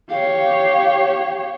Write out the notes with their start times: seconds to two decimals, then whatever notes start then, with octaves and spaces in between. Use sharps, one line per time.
0.10 G4 C#5 F5